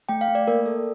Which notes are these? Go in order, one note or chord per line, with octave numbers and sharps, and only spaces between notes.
A3 G5
F5
A3
D5
A#3 A#4
A4